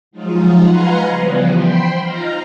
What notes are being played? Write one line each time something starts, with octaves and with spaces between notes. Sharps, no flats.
F3 F#3 G#3 D#4 F4
B4 F5 F#5 G#5 A#5 C6
C#3 E3 F3 G3 B3
C5 G5 B5 C6
D#4 F4 F5 A#5